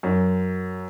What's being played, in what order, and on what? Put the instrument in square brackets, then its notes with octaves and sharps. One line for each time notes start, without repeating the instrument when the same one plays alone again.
[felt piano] F#2